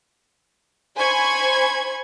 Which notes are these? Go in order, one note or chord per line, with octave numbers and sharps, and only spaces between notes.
C5 G#5 B5 C#6 G#6